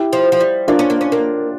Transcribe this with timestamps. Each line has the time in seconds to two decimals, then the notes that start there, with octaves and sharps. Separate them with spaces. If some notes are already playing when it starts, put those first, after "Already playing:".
Already playing: E4 G4
0.13 F3
0.32 F3
0.41 G3
0.68 A#3 D4 F4
0.79 C#4
0.90 A#3
1.01 C#4
1.12 A#3